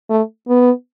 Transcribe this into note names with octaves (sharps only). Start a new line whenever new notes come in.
A3
B3